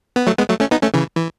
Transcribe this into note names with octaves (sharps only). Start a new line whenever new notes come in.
B3
F#3 A3
G#3 B3
F#3 A3
A3 C#4
B3 D#4
A3 C#4
C#3 E3
E3